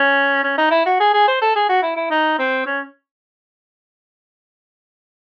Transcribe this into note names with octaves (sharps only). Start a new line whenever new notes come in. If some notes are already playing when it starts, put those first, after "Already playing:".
Already playing: C#4
C#4
D#4
E4
F#4
G#4
G#4
C5
A4
G#4
F#4
E4
E4
D#4
C4
C#4